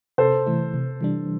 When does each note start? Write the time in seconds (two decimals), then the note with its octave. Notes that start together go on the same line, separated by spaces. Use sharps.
0.18 C3 A4 C5
0.46 E3 A3 E4
0.74 C3
1.01 E3 G3 D4